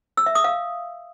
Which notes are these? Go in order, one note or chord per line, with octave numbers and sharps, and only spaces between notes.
E6
E5
D#6
F5